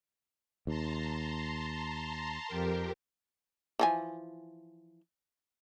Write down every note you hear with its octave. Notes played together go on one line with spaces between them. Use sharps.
D#2 A5 A#5 C6
F2 G4 A#4
E3 F3 G#5